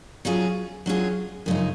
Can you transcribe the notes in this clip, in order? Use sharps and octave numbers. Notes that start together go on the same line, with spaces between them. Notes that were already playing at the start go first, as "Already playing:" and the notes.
F#3 C#4 F4 G#4
F#3 C#4 F4 G#4
F#2 C#3 F3 G#3 D#4